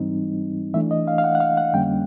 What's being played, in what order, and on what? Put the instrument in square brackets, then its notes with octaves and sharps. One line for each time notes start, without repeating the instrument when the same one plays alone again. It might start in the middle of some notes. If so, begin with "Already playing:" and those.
Already playing: [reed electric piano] G#2 E3 G3 C4 D#4
E3 A3 D4 E5
D#5
F5
F5
F#5
F#5
F5
F#5
F2 D3 G3 A#3 C#4 G5